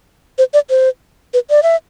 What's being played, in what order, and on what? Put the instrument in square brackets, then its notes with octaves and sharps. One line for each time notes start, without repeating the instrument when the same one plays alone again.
[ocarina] C5
D5
C5
B4
D5
E5